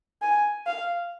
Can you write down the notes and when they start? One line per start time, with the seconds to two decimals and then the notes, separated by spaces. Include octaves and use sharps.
0.22 G#5
0.67 F5